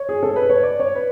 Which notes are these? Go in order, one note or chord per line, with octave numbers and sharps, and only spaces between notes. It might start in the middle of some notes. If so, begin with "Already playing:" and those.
Already playing: C#5
G#4
A4
B4
C#5
D5
C#5
B4